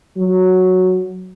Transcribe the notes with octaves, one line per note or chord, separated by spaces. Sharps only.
F#3